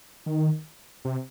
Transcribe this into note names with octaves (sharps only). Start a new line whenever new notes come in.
D#3
C3